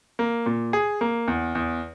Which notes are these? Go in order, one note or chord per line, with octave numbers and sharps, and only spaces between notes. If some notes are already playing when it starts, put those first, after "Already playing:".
A#3
A#2
G#4
A#3
E2
E2